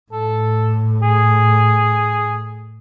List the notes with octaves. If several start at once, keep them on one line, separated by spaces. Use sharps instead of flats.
A2 A4
G#4